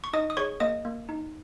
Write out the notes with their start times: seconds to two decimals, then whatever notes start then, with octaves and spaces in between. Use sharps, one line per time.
0.04 C#6
0.13 D#4 D#5 D#6
0.30 D#6
0.37 G#4 C#5 C#6
0.60 A#3 D#5 D#6
0.85 A#3
1.09 D#4